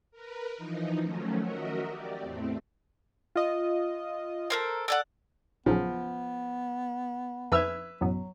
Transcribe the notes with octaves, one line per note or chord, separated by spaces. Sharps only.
A#4 B4
E3 F3 D#4
D#3 F3 F#3 A3 C#4
F#4 A#4 D#5 E5
G4 D5
E2 A2 A3 C4
F4 D#5
A4 A#4 C5
A4 D5 F#5
A#1 F#2 C#3 F3 B3
F2 B4 E5 E6 F6 G#6
A1 F#2 B2 F#3